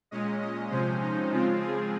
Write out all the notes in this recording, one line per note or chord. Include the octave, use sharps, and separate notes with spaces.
A#2 G#3 C#4 D#5
D#5
C3 F3 G#3 C#4 C5
D#4
C#3 F3 G#3 C4 F4
G#4